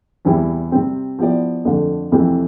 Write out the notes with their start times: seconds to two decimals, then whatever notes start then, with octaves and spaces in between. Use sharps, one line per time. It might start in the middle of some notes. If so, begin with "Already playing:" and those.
0.25 E2 C3 G3 C4 E4
0.72 C3 G3 C4
1.19 F3 B3 E4 G4 D5
1.65 F2 D3 A3
2.12 F2 C3 E3 A3 C4